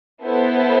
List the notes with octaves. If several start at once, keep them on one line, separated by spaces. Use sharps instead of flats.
B3 E4 A4 C5